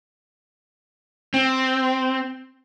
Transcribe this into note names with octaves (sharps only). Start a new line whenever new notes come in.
C4